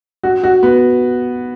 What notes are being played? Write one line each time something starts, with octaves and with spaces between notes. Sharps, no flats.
F#4
F#4
B3